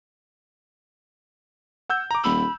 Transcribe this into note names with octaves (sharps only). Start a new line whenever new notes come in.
F#5 E6 G6
A#5 D6
D#1 B5 E6